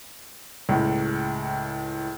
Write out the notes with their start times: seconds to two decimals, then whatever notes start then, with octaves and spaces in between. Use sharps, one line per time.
0.69 C#2 A2